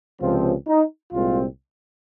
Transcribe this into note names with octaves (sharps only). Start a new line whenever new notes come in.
C#2 C3 F3 C4 F4
D#4
C2 A#2 G#3 C4 F4